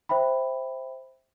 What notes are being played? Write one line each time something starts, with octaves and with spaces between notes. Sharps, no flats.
C5 E5 G5 B5